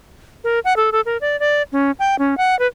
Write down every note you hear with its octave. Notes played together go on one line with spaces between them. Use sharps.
A#4
F#5
A4
A4
A#4
D5
D5
C#4
G5
C#4
F#5
B4